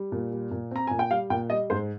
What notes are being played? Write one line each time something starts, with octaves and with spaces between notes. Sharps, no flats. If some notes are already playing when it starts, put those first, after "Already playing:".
Already playing: G3
A#2
G3
A#2
C4 A#5
A#2 G#5
G5
G3 F5
A#2 G5
G3 D#5
G#2 C5